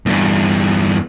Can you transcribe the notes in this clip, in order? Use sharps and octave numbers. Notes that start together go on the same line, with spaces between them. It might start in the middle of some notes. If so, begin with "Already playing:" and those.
E2 G2